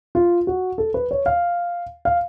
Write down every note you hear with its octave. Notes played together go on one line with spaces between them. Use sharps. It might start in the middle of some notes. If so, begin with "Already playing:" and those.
F4
F#4
A4
B4
C#5
F5
F5